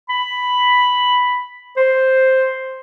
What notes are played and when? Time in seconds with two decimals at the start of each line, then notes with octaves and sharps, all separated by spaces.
0.09 B5
1.77 C5